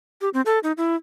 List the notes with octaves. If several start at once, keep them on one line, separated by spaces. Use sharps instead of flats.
G4
C4
A4
D#4
E4